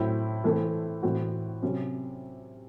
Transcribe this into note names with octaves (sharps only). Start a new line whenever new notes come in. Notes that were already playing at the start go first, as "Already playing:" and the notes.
Already playing: A2 F#3 C4 E4
E3 A3 C4
A2 E3 C4 F#4
C3 F#3 C#4